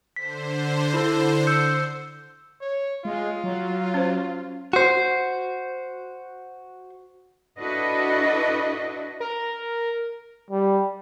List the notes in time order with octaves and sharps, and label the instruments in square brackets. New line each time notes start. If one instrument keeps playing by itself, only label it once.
[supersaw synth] D3 C5 [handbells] B6
[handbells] E4 A4
E6 G6 C#7
[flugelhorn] C#5
[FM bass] G#3 [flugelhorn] F4
[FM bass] F#3
[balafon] C#4 C5
[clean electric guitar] F#4 C5
[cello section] D4 E4 F#4 A4 B4 D#5
[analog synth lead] A#4
[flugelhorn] G3